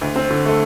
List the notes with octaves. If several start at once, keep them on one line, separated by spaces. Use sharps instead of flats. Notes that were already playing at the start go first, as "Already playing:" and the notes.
D2
C4
D3
A3